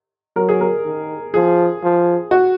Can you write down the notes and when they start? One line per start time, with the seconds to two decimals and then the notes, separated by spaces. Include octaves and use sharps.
0.36 F#3 A#4
0.49 G#4
0.61 A#4
0.85 D#3
1.34 F3 G#4
1.83 F3
2.31 F#4